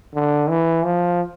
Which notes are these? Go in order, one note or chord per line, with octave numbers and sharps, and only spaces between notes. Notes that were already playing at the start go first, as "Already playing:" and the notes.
D3
E3
F3